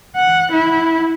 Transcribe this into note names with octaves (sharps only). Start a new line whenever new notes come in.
F#5
E4